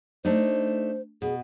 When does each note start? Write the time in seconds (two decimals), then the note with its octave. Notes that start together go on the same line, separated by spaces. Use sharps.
0.25 A3 D4 D#4 C5
1.22 B2 G#4